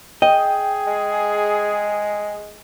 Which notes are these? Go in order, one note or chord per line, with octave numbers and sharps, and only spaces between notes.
G#4 D#5 G5
G#3